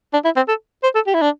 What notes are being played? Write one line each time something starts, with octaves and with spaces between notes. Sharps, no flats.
D4
E4
C4
A4
C5
A4
G4
E4
D4